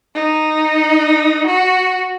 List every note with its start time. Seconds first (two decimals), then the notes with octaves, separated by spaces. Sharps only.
0.15 D#4
1.47 F#4